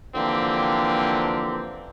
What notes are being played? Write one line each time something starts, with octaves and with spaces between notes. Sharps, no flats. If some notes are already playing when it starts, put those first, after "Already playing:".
D3 E3 F3 A#3 C4 G4